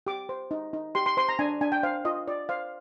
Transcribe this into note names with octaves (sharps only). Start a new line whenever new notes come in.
G4 D6
C5
D#4
D#4
G4 C6
C6
C5 C6
A#5
D4 G#5
D4 G#5
G5
C5 F5
F4 D#5
F4 D5
C5 F5